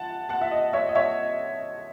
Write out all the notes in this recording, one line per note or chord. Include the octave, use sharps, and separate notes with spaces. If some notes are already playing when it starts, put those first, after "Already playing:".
Already playing: F#5 A5
F#5 A5
E5
D#5
C#5 E5
D#5
C#5 E5